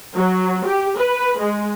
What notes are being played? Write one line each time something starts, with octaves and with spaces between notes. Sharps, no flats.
F#3
G4
B4
G#3